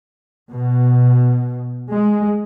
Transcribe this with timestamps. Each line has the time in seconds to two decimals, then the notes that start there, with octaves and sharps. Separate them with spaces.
0.51 B2
1.92 G#3